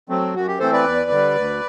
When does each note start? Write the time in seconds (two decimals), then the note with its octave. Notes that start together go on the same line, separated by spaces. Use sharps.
0.09 F#3 A3 C4
0.35 F#2 F#4
0.48 G4
0.59 E3 A3 C4 A4 C5
0.73 B4 D5
0.85 E2
1.10 D3 G3
1.36 D2